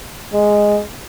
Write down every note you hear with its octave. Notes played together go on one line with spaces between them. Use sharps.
G#3